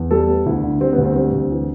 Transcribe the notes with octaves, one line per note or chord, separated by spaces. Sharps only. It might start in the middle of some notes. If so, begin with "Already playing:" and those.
Already playing: E2
G3 A4
B3
D2 E4
D3
G3 C4
B3
D2
C4
G3 C4
D2
E3